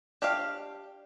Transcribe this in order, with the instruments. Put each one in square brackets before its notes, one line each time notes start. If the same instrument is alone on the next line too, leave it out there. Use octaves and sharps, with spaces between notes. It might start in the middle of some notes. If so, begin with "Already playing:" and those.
[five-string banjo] D4 G4 F5